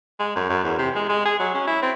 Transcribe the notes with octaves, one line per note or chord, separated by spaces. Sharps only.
G#3
F#2
F#2
E2
C3
G#3
G#3
G#4
F#3
C#4
E4
C4